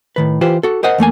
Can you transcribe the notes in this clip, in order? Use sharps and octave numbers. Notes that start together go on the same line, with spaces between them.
A2 D#3 B4
E3 F4 G4 B4 C5
F#4 A4
A#4 C5 D#5 F#5
E2 A3 A#3 G#5